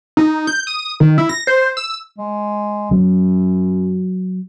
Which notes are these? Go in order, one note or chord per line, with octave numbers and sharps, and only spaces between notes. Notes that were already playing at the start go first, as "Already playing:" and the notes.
D#4
G6
D#6
D#3
E4
A#6
C5
E6
G#3
F#2 F#3